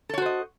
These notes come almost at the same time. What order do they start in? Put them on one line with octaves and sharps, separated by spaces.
A4 C#5 F#4 C5 D#5